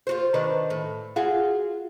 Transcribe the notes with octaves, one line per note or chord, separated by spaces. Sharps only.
F4 F#4 C5
D#3 D4 B4
A2
F4 F#4 G#4